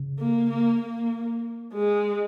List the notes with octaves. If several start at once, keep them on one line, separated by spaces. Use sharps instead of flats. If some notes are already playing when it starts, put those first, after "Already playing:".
Already playing: C#3
A#3
A#3
A#3
G#3